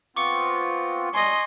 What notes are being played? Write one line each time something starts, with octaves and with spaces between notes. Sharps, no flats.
B3 C4 F4 C#6 D6 C#7
G3 D#5 G#5 C6